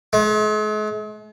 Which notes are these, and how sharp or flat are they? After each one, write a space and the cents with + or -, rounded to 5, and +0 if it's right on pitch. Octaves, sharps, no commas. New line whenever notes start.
G#3 +45